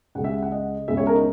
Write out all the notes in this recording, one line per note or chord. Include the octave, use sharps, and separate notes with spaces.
C#2 C#3 G#3 F#5
E5
F#5
D#5
C#2 B2 G#3 E5
C#5
A#4
D#4